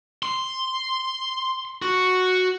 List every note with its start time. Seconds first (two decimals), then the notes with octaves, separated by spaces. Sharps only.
0.23 C6
1.82 F#4